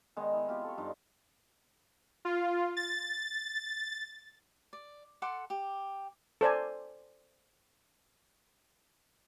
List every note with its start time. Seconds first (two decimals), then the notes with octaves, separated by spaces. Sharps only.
0.17 D#3 G#3 B3 D#4
0.33 E4
0.47 C4 F4 G4
0.64 A4 C#5
0.78 G2 D4 D#4 F4
2.25 F4
2.77 A6
4.73 D5
5.22 A4 F#5 C6 D6
5.50 G4
6.41 A4 C5 D5 G#5